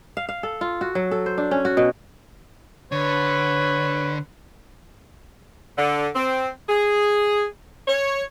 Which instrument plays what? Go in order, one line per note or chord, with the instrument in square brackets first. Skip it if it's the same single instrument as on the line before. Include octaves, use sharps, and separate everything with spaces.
[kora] F5
F5
A4
F4
F#4
F#3
A4
C5
D4
C#4
F#4
B2
[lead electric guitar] D3 [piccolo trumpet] B4 [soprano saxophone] C#5
[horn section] D3
C4
G#4
C#5